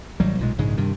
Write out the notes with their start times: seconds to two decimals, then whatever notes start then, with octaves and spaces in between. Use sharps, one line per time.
0.20 G#1 F#3 G3
0.39 B1 A#2 G#3
0.58 A#1 G#2 C#3 G#3
0.77 G2 C3 D#3